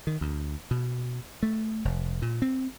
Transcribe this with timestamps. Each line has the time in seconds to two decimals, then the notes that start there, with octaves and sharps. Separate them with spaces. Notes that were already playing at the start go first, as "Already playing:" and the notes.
0.07 D#3
0.21 D2
0.71 B2
1.43 A3
1.85 F1
2.22 A#2
2.42 C4